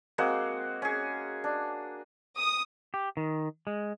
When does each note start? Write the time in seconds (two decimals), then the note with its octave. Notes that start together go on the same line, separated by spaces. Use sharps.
0.18 G#3 A#3 C4 F#4
0.82 C#4 G#4
1.44 D4
2.36 D#6
2.94 G4
3.17 D#3
3.67 G#3